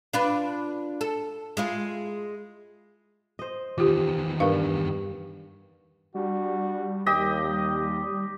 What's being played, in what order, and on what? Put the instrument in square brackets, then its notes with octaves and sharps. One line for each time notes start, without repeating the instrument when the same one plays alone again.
[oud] D4 F4 B4
A4
G#3 E4 F4
[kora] C5 D#5
[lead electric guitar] E2 D#3 [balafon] F4 G4
[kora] G2 [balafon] A#4 F5
[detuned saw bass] G3 [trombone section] D4 F#4
[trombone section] D#2 [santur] G4 D#5